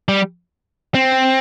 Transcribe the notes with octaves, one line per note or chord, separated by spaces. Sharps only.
G3
C4